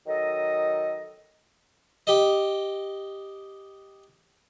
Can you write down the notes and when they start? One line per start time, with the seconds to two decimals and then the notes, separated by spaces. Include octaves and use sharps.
0.07 D#3 F#3 A4 D#5
2.07 G4 D#5